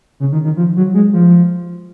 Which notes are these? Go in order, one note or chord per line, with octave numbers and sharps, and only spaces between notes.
C#3
D#3
D#3
F3
F#3
G#3
F3